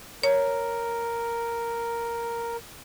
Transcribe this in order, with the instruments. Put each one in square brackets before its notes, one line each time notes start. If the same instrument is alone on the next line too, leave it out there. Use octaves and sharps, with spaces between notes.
[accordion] A#4 [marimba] C#5